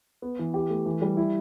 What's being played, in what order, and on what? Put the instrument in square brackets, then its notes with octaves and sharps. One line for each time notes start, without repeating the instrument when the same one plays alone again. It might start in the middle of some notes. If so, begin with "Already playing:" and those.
[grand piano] B3
E3
G4
A3
E3
G3
E4